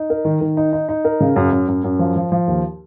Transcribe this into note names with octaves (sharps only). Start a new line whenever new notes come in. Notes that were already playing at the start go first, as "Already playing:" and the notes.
Already playing: D#4
A#4
D#3
D#3
D#4
D#4
D#4
A#4
C#3
F#2
F#2
F#2
F#2
F3
F3
F3
D#2